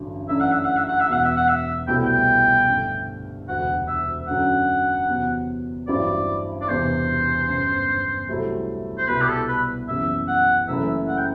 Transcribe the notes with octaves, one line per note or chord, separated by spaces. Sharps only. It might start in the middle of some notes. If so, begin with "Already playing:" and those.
Already playing: A1 G2 D3 F#3
F#2 E3 A3 D4 E5
F#5
E5
F#5
E5
F#5
E5
E1 E2 B2 F#5
E5
F#5
E5
C2 B2 A3 E4 G5
G5
G2 D3 A3
E1 D2 C3 F#5
E5
F#2 D3 F#3 F#5
E2 C3 F#3 B3
A1 G2 F#3 C4 E4 D5
D5
E1 E2 C3 C5
G1 F#2 D3
C2 C3 F#3 A3 E4
C5
C2 B2 G3 B3 E4 B4
G4
A4
B4
F#1 F#2 E3 G3 B3 E5
F#5
F#1 F#2 E3 A3 E4 E5
F#5
G5